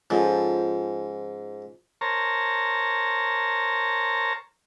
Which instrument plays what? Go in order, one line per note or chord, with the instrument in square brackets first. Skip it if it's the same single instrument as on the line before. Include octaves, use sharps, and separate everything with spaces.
[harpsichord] G#2 [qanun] F3 C#4 A4
[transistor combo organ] A#4 C5 C#5 A5 A#5